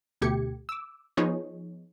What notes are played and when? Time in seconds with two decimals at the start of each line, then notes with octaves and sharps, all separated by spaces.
0.22 D2 B2 A3 G4 G#6 C#7
0.69 D6 E6
1.17 F3 B3 D#4 G#4 C#5